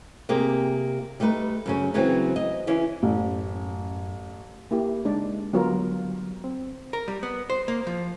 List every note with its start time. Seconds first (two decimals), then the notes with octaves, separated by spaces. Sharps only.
0.29 C3 A#3 F4 G4 G#4
1.20 G3 A3 D#4 A#4 B4
1.66 F#2 C#3 C#4
1.94 C#3 E3 F#3 B3 C4
2.36 D#5
2.67 E3 C#4 E4
3.03 A1 F#2
4.71 A#3 E4 G4
5.05 C#2 G#3 D4 D#4 D5
5.53 D3 F#3 G3 B3 F4 A#4
6.44 C4
6.93 A#4
7.08 G3
7.23 B3
7.50 C5
7.68 A#3
7.87 F3